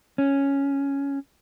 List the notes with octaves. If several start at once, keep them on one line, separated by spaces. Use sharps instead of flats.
C#4